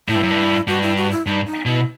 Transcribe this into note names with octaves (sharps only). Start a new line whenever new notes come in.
A2 E4
G2
F#2
G2
G2 F#4
E4
F#4
E4
G2 D#4
D#4
B2 E4